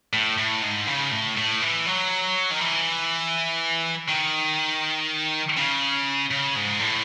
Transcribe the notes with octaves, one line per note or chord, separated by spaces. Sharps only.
A2
A2
G#2
C#3
A2
A2
E3
F#3
D#3
E3
D#3
C#3
C#3
G#2
A2